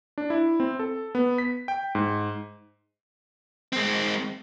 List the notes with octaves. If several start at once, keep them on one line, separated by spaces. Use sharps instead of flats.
D4
E4
C4
A4
B3
B6
G5
G#2
G#3 C4